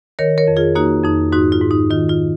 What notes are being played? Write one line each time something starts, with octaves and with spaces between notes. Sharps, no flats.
D#3 A#4 C#5
A#4 C#5
F2
F4 G#4
A#3 D#4 F#4
F2 D#4
G#2 D#4 F#4
F4
G#2
D#4
D#3 F4
F4